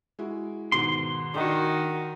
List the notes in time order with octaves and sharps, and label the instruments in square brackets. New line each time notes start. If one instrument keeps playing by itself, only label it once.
[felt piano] G#3 E4 F#4
[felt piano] G#2 B2 D#3 [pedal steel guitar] C6
[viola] D#3 F#4 [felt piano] D4 D#5